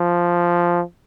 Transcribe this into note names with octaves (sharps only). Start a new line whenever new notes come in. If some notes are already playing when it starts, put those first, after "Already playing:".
Already playing: F3